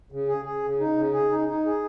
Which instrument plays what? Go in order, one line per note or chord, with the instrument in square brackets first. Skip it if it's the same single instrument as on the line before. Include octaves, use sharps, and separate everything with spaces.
[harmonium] C#3
G#4
G#4
C#3
D#4
C#3
G#4
D#4
D#4
G#4